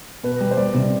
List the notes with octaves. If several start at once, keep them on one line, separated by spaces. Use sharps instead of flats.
B2 B4
G3
C5
G3 D5
C3